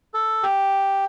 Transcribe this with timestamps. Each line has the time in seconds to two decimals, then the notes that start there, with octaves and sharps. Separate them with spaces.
0.14 A4
0.43 G4